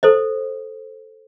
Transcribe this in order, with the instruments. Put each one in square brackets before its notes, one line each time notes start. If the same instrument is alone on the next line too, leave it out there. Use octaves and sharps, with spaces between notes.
[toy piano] A4 C5 D#5